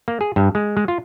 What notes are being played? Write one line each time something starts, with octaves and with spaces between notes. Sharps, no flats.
A#3
G#4
G2
G#3
G#3
F4